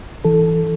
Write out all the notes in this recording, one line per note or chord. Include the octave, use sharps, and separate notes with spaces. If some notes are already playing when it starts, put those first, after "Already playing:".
E3 A4